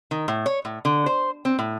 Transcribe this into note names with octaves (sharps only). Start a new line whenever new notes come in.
D#3
A2
C#5
A2
D3
C5
C4
A2